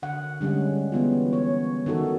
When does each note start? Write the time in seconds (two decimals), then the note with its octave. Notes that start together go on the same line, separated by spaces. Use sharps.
0.03 D3 F#5
0.41 D3 G3 G#3 C#4
0.92 E3 B3 F4
1.33 C#5
1.86 D#3 D#4 F#4 A4